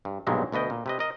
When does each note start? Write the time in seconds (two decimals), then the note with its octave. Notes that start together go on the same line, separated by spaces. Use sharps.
0.05 G2
0.27 B1 G2 A#2 F#3 G#3 E4
0.52 D2 B2 B3 D#5 G5
0.70 A#2
0.86 C3 B4 D#5
0.99 A#4 D#5